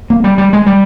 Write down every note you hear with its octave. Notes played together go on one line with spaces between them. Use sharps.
A#3
G3
G3
G#3
G3